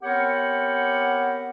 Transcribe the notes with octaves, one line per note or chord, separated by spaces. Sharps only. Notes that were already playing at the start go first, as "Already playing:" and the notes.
B3 C4 G4 A#4 C#5 F#5